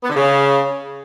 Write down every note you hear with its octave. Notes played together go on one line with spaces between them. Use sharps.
B3
D3
C#3